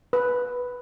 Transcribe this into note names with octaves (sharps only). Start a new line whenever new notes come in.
B4